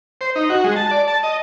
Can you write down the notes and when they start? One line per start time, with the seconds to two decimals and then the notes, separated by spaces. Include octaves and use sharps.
0.21 C5
0.36 D#4
0.49 F#4
0.64 G#3
0.76 A5
0.91 D5
1.08 A5
1.23 D#5